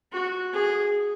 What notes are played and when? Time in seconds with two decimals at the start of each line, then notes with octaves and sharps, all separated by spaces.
0.13 F#4
0.53 G#4